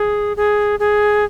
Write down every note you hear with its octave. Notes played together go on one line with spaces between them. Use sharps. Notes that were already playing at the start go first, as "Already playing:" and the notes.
Already playing: G#4
G#4
G#4